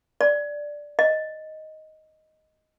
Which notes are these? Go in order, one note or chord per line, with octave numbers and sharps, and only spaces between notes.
D5
D#5